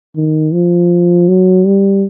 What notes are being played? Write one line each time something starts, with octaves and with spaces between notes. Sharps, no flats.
D#3
F3
F#3
G3